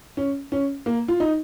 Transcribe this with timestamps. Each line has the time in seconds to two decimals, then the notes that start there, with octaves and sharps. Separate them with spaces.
0.17 C#4
0.52 C#4
0.86 A#3
1.08 F4
1.20 D#4